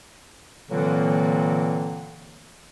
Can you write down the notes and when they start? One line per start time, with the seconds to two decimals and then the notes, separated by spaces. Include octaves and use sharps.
0.70 A#2 D3 E3 F#3 A#3 C4